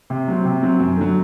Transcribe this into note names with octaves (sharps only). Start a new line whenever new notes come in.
C3
F#3 C4
C3
F#3 C4
F#2
D3 F#3